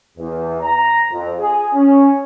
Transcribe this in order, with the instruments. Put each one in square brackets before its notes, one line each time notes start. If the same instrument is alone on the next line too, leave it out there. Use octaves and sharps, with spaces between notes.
[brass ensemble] E2
A#5
F2
G#4
C#4